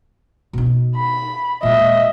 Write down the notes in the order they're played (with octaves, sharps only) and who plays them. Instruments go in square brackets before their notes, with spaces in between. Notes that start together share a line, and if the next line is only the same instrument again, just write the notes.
[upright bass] B2 D#4
[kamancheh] B5
[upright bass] A#2 G#3 [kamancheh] D#5 E5